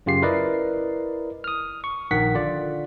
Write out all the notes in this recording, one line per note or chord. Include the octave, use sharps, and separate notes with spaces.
F#2 C#3 F4 G4 C7
E4 A#4 B4 D5 D#5
D#6 F6
C#6
A#1 D#3 F#5 B6
D3 F4 D5